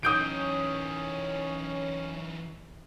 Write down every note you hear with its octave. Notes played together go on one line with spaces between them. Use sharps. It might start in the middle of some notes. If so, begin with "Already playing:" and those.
E3 C#4 D#4 D#6 G6 D7